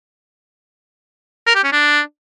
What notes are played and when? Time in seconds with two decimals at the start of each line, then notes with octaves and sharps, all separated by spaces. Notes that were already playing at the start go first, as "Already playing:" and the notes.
1.47 A#4
1.55 G4
1.64 C#4
1.72 D4